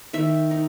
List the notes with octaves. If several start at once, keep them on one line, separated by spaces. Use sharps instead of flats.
D#3 E5
D#4